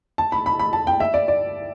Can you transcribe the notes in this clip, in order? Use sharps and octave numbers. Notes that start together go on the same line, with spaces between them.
A5
B5
B5
B5
A5
G5
E5
D5
D5